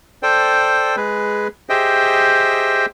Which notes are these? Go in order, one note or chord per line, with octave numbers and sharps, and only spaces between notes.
A4 C5 D5 G5
G#3 G#4 B4
G4 G#4 C5 D#5 E5 G5